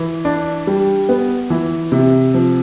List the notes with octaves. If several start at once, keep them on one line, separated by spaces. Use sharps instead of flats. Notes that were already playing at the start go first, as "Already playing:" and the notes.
Already playing: E3
D4
G3
B3
E3
C3
F3